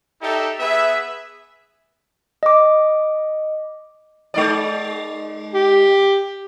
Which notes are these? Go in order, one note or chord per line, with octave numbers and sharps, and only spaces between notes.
D#4 G4 A4 D5 E5
B3 G#4 B4 E5
D#5 D6
G#3 D#4 D5
G4